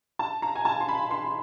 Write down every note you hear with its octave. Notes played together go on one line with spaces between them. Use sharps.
A5
A#5
G#5
A5
C6
B5
C6